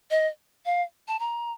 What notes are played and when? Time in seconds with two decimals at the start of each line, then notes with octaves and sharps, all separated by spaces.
0.11 D#5
0.66 F5
1.08 A5
1.19 A#5